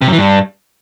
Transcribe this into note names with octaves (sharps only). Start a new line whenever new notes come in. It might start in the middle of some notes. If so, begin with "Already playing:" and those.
C3
F#2
E3
G2